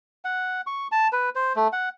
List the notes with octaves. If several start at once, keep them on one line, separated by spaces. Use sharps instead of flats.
F#5
C#6
A5
B4
C5
A3
F#5